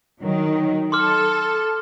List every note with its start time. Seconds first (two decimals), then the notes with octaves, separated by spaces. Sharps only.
0.22 D#3 F#3
0.92 A4 C6 D6 F6